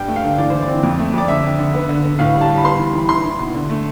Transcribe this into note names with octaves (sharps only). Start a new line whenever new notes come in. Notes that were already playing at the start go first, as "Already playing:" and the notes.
Already playing: G2 G5
A3
F5
D3
E3 D5
E3 C5
D5
C4
F2
A3
F2 D5
D3 E5
D3
D3
B3
D3
D3
A2 F5
G3
A5
G3
B5
B3 C6
E3
E3 B5
E4 C6
E4
B2
D3
A3